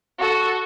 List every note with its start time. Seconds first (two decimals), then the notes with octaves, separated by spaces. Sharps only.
0.20 F#4 A4